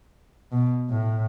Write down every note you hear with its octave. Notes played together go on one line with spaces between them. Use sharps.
B2
A2